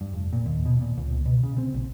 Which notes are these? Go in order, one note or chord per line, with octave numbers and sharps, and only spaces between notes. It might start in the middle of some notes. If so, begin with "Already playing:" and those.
G2
F1
A#2
D#2
B2
A#2
C#2
B2
C#3
C4
A#1